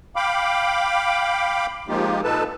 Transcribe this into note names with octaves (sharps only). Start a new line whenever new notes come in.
F5 G5 B5 D6
F3 G#3 A#3 D#4 F4 G4
A#2 G#3 D#4 A4 B4 A5